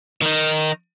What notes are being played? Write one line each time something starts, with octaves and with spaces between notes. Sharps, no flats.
D#3 D#4